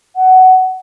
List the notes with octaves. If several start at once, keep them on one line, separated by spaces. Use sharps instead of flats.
F#5